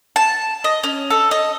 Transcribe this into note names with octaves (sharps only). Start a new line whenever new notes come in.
A5
D#5
C#4
A4
D#5